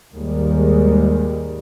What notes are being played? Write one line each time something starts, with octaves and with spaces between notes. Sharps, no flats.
D#2 G#2 D#3 G3 G#3